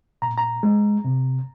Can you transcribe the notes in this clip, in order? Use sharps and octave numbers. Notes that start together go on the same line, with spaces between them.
A#2 A#5
A#5
G#3
C3